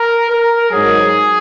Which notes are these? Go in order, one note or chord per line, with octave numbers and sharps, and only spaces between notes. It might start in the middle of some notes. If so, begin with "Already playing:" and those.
Already playing: A#4
A#4
G#2 F#3 G#4